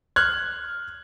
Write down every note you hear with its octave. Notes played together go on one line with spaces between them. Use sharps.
F6 F#6 G#6